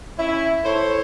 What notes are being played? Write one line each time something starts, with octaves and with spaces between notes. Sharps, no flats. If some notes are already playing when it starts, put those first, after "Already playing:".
C#4 E4
E4 A4 C5 C#5